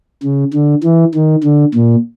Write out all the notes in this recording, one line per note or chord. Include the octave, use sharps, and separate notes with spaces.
C#3
D3
E3
D#3
D3
A#2